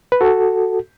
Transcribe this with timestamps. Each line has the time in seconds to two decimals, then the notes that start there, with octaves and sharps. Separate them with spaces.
0.12 B4
0.21 F#4 A4